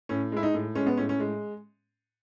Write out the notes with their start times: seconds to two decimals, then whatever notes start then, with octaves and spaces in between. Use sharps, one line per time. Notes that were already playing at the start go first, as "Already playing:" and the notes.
0.09 A2 C#4
0.32 G#3 E4
0.43 D#4
0.54 A2
0.75 G#3 C#4
0.86 B3
0.97 A2 C#4
1.09 C#4
1.20 G#3